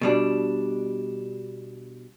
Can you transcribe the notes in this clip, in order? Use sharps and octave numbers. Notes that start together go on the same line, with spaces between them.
B2 G3 D4